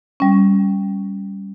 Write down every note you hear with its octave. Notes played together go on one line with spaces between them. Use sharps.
G3 C#4